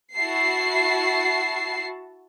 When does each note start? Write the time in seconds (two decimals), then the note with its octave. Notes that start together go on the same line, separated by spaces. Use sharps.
0.16 E4 F#4 A5 C7